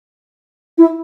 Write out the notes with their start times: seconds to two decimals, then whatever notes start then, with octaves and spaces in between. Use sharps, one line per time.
0.78 E4